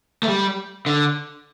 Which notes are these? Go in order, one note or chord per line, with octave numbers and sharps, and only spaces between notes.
A3
G3
D3